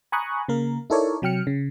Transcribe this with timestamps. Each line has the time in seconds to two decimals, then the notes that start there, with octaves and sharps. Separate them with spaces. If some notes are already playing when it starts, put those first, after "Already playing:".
0.12 G#5 A#5 B5 C#6 D#6 F#6
0.48 C#3 A#3 A#4
0.90 D#4 E4 A4 A#4 C#5 D5
1.22 C3 F#3 G5 F6 C#7
1.47 C#3